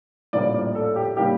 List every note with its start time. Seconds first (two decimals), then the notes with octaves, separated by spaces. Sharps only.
0.33 A#1 A2 G3 A#3 D5
0.54 D5
0.75 A4
0.96 G4
1.17 A2 G3 A#3 G4